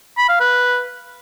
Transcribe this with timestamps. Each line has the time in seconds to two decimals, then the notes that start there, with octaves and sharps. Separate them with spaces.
0.18 B5
0.29 F5
0.40 B4